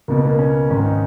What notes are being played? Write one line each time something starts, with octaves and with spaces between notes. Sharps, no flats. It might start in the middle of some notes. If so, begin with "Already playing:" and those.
C#2 B2 A#3
B3
A#3
C#4
G#1 G#2 D#3 C#4
D#4